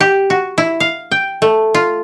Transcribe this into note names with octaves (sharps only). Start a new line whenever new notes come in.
G4
F#4
E4
F5
G5
A3
F4